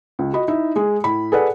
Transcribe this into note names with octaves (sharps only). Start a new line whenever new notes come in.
C#2
F#4 D#5 B5
D#4 E4 E5
G#3 G#4
A2 B5
G#4 A4 B4 D5 F#5